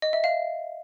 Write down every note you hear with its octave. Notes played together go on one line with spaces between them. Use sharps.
D#5
E5
F5